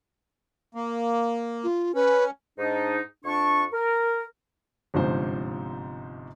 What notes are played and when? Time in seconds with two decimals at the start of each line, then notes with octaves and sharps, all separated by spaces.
0.75 A#3
1.64 F4
1.95 C#4 B4
2.59 G#2 D4 D#4
3.25 F2 D4 C#6
3.73 A#4
4.94 G1 G#2 C3 F3 C5